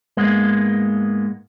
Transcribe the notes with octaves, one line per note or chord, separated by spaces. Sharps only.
G#2 G#3 A#3 B3